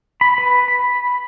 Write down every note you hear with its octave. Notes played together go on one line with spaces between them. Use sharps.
B5
B4
B5